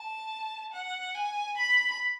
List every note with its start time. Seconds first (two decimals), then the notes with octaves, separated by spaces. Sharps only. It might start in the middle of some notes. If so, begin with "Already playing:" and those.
Already playing: A5
0.73 F#5
1.14 G#5
1.57 B5